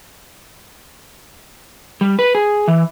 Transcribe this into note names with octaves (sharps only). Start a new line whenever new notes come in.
G3
B4
G#4
E3